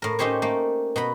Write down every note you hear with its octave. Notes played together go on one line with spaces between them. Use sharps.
A2 A#4
C#4 D#4 G4 C5 C#5
A3 A#3
B2 A#5 B5